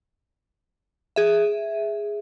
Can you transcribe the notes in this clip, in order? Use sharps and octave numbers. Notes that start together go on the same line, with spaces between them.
G#4 E5